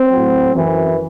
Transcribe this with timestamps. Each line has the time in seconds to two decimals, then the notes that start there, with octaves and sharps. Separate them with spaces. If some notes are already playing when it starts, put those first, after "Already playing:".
Already playing: C4
0.11 A2 F#3
0.53 F#2 E3